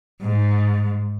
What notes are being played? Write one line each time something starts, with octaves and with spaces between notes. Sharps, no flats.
G#2